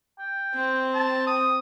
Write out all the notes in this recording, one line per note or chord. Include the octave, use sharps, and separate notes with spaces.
G5
C4
A5
D#6